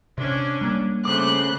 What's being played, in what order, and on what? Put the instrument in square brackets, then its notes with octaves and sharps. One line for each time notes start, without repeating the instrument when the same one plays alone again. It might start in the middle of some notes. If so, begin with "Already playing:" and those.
[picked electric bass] C3 [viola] C#4 D4
[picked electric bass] G3 A#3
[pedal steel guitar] C#3 D6 [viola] A3 C5 [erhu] F#6